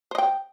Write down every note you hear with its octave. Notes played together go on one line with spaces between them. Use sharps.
C5 D#5 G5